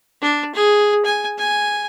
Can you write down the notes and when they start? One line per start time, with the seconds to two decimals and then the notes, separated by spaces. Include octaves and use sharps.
0.22 D4
0.55 G#4
1.05 G#5
1.38 G#5